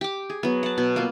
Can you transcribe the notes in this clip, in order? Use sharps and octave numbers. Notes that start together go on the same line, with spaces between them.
G4 D6
G#4
F#3 B3
F#5 A5
B2
A#3 B3 F4